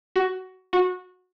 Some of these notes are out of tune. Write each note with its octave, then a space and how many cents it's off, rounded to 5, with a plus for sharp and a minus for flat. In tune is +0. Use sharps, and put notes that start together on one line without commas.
F#4 +15
F#4 -20